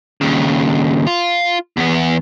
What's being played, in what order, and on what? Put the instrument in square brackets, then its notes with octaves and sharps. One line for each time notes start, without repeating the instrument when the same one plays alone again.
[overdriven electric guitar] D#2 C#3
F4
E2 B3